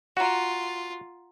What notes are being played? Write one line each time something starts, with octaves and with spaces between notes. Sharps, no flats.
F4 F#4 F#5 A#5